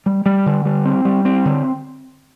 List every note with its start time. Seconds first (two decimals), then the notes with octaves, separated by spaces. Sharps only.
0.06 G3
0.26 G3
0.46 D3
0.65 G3
0.85 C4
1.05 G3
1.25 C4
1.45 D3